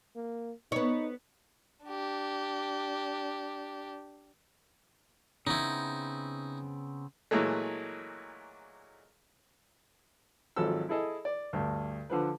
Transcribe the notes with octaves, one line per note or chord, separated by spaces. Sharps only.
A#3
B3 D#4 C#5
D4 G4
C#3 B3 C4 D#4 E4
A#2 E3 F#3 G#3 A3
G#1 F3 F#3 A4 E6
E4 G#4 A4 D#5
D5
D2 G2
D3 F3 B4